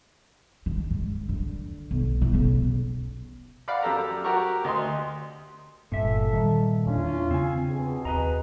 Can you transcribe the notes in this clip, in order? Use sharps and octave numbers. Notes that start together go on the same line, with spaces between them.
D#3
G#2
D3
B1
E3
B1 C#3
D5 F5 F#5 B5 D6
F#2 G4 A4 A#5
F#4 G4 A#4 A#5 C#6
D2 D#5 C6
G1 G2 A#2 A4 E5
D#3 G3
E2 A3 C#4 D4 E4 F4
C#3 C4 G#5
B2 G#4
D#2 B4 D#5 A#5